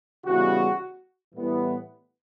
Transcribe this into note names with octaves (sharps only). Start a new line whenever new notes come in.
C#3 E3 G3 B3 F#4
A2 E3 G3 B3